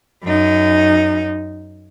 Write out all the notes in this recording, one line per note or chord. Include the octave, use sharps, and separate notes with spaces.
F#2 D#4